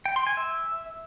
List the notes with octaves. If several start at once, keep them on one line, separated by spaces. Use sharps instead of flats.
G5
C6
G#5
E5